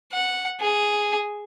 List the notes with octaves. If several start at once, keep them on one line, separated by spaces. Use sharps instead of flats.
F#5
G#4